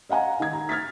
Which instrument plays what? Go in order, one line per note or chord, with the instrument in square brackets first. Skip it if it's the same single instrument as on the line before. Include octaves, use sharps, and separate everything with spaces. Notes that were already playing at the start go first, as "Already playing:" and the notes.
[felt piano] D#5 F5 F#5 G#5 A#5
D#3 G#6
A#5
F6 G#6 A6 B6